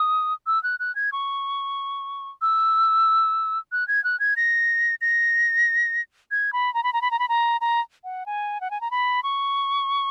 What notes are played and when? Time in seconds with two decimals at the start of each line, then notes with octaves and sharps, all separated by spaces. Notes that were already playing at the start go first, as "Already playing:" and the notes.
Already playing: D#6
0.47 E6
0.63 F#6
0.80 F#6
0.95 G#6
1.12 C#6
2.42 E6
3.72 F#6
3.88 G#6
4.04 F#6
4.20 G#6
4.37 A#6
5.01 A#6
6.31 G#6
6.53 B5
6.74 A#5
6.84 B5
6.93 A#5
7.02 B5
7.11 A#5
7.19 B5
7.29 A#5
7.61 A#5
8.04 F#5
8.26 G#5
8.61 F#5
8.71 G#5
8.81 A#5
8.91 B5
9.23 C#6